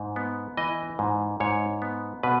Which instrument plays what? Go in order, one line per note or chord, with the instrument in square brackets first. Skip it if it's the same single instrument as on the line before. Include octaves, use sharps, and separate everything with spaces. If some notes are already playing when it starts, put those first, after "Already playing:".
Already playing: [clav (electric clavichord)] G#2
B3
E3 D#5
G#2
G#2 C#5
B3
B2 B4